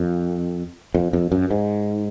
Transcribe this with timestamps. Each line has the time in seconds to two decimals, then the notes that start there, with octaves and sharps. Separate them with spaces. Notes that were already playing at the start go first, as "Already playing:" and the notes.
Already playing: F2
0.95 F2
1.13 F2
1.32 F#2
1.51 G#2